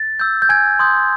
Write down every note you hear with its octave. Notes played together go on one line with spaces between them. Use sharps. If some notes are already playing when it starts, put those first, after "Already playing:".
Already playing: A6
E6 G6
G6
G#5 G#6
C6 D#6 G6